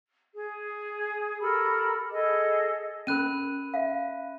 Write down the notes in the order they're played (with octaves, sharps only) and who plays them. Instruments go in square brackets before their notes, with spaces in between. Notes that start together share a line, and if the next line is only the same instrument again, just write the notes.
[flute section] G#4
G4 A4 A#4 B5
G#4 A4 D#5
[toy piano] C#4 A#4 [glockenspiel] B5 F#6 D#7
[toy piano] E5 F5